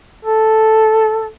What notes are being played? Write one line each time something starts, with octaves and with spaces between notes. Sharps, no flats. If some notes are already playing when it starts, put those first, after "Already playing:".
A4